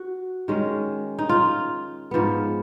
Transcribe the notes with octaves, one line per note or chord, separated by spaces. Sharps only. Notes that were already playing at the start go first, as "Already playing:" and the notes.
Already playing: F#4
D#3 G#3 C#4
D#4
F4
G#2 F3 B3